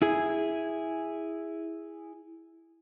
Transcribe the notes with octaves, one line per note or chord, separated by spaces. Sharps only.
E4 G#4